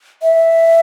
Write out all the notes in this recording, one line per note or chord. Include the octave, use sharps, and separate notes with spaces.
E5